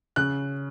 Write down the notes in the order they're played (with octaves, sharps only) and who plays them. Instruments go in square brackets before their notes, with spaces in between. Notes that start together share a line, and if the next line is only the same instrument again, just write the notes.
[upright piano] C#3 F#6